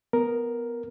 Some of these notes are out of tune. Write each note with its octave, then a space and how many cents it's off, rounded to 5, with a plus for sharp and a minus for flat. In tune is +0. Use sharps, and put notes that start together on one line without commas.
B3 +0 A#4 +5